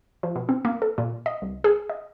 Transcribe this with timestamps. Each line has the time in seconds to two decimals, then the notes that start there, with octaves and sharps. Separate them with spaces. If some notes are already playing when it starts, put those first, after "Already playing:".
0.23 F3
0.36 B2
0.49 C4
0.65 A#3
0.82 A4
0.98 A#2
1.26 D#5
1.42 C2
1.64 G#4
1.90 D#5